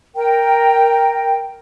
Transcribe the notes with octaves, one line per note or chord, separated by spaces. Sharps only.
A#4 G5